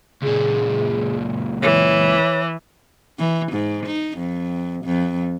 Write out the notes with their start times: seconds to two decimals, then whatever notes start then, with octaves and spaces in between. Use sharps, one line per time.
0.23 C#2 A#2 G#4
1.62 E3 C#5
3.18 E3
3.52 G#2
3.87 D#4
4.18 F2
4.85 F2